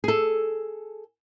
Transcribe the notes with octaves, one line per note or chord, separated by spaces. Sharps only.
G#4 A4